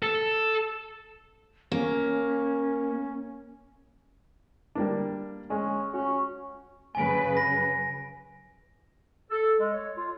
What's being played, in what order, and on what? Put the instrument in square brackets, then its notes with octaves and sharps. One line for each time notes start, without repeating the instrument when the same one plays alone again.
[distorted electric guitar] A4
[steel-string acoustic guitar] A#3 [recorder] C#4
[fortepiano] G3 A#3 D4
[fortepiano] G#3 [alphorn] C#4
[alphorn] C#4 [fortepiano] F#4
[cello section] F#2 C#3 B4 [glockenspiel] G#5 D7
[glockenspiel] A#6
[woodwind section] A4
G#3
C#5
F4